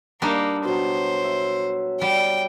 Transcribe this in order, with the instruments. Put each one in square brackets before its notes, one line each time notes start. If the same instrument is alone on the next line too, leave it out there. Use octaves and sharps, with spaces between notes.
[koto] G3 D4 D#4 [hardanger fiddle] A#3
[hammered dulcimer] B2 F#3 [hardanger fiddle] C5
[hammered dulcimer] E5
[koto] G3 [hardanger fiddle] G5